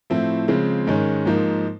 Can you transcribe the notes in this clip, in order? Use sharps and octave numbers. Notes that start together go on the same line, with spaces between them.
A2 F3 A3 C4 E4
C#3 F3 G#3 C4
G#2 D#3 G#3 C#4
G#2 F3 A#3 D#4